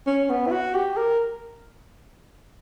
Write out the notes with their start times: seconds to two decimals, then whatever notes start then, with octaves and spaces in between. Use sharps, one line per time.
0.07 C#4
0.30 B3
0.47 E4
0.52 F#4
0.75 G4
0.97 A#4